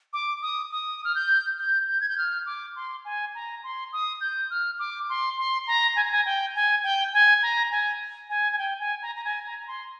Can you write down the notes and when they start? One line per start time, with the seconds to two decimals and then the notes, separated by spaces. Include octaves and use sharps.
0.13 D6
0.42 D#6
0.71 D#6
1.05 F6
1.15 G6
1.59 G6
1.88 G6
2.01 G#6
2.09 G6
2.18 F6
2.46 D6
2.76 C6
3.05 G#5
3.35 A#5
3.64 C6
3.93 D#6
4.21 G6
4.50 F6
4.79 D6
5.09 C6
5.38 C6
5.67 A#5
5.96 G#5
6.05 A#5
6.12 G#5
6.26 G5
6.55 G#5
6.84 G5
7.13 G#5
7.42 A#5
7.71 G#5
8.30 G#5
8.53 G#5
8.58 G5
8.80 G#5
9.02 A#5
9.16 A#5
9.25 G#5
9.46 A#5
9.59 A#5
9.67 C6